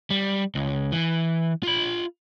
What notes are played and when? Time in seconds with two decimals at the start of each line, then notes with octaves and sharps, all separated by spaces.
0.10 G3
0.55 C#2
0.92 E3
1.63 F4 B5